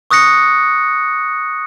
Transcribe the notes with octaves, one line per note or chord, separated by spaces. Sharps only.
C#6 D#6 F#6 A#6 C#7